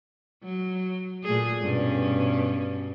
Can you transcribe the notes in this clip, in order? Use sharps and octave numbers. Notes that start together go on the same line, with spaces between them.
F#3
A#2 A3 G#4
G2 B2 C#4